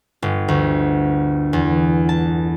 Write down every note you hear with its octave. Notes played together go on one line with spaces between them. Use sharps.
G1
D2
E2
A5